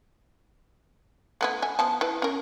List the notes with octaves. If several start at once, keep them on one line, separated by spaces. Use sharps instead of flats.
A3 B3 E4
E5 G#5
F3 B3 A5
E4 B4
C#4 A#4